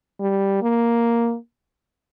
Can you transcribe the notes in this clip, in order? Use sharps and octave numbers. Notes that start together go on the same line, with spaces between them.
G3
A#3